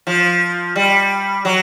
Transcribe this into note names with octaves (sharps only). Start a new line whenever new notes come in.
F3
G3
F#3